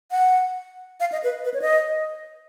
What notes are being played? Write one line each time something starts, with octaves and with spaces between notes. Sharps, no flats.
F#5
F5
D#5
B4
B4
C#5
D#5